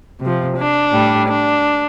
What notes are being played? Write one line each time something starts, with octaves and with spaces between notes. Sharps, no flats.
C3 F3
D4
A2 G3
D4